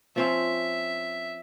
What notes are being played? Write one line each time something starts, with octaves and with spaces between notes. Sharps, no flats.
F3 C4 C#4 E5